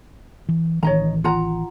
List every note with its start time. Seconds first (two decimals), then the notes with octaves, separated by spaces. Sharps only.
0.49 E3
0.83 A1 D#3 E3 C#5 D#5 A#5
1.24 F4 F#5 A#5